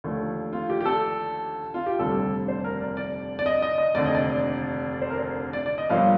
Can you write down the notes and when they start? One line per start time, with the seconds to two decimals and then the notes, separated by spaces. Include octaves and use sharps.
0.04 D#2 D3 F3 A3
0.53 F4
0.70 G4
0.81 G4
0.85 A4
1.74 F4
1.86 G4
1.99 F1 D#2 D3 G3 A4
2.48 C5
2.64 A#4
2.81 D5
2.97 D5
3.39 D5
3.46 D#5
3.62 D#5
3.78 D#5
3.94 F1 D#2 D3 D5
4.05 D#5
4.15 D5
4.92 D5
5.02 C5
5.10 A#4
5.19 C5
5.53 D5
5.66 D5
5.78 D#5
5.89 G1 G2 F3 A#3 F5